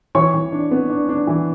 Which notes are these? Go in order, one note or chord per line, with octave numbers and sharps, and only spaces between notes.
E3 C#5 C#6
E3
D4
B3
D4
D4
E3